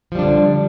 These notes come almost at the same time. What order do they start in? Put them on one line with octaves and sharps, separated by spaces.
F3 G3 D4 D3